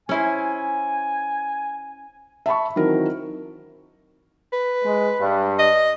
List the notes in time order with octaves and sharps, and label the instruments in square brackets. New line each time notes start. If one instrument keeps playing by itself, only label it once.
[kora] C#4 E4 C5 [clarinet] G#5
[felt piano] E5 A5 B5 C#6
D#3 E3 F#3 C4 A#4
[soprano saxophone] B4
[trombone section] G#3
G2
[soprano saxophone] D#5